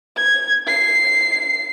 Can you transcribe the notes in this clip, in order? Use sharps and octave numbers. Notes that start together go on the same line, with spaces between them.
G#6
C7